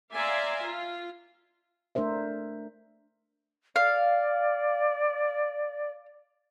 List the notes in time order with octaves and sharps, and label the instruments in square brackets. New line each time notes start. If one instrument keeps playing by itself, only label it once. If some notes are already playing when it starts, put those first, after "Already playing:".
[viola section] D5 E5 F5 G#5 A#5 C6
F4
[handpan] A3 D4 A#4 C5 E5
[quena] D5 [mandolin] F5